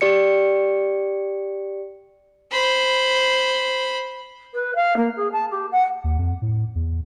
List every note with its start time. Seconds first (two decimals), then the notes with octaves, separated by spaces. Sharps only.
0.01 G4 D5 C#7
2.51 C5 B5
4.54 B4
4.75 F5
4.96 A#3
5.16 G#4
5.31 A5
5.50 G4
5.71 F#5
6.04 D#2
6.18 F2
6.42 A2
6.75 E2